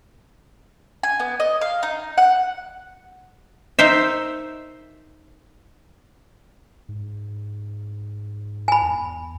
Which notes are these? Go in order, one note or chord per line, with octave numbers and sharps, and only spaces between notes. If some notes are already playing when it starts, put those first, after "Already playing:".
G#5
B3
D#5
F5
D#4
F#5
D#4 A#4 C5 E5
G#2
G#5 B5
E2